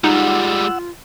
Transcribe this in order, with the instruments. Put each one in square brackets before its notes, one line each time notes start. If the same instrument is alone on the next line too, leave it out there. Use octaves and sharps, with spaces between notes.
[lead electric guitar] G3 G#3 [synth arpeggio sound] D#4 [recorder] F4 [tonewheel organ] F#5 E6